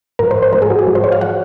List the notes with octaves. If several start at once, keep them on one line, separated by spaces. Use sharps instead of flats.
G#2 F3 A#4
C5
C5
G#2 F3 A#4
G#4
F#4
G#4
G#2 F3
C5
C#5
F5
F3 F#5